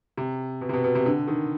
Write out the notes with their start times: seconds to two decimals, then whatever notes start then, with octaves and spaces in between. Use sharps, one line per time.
0.17 C3
0.61 B2
0.69 C3
0.73 B2
0.84 B2
0.95 C3
1.06 D3
1.28 D#3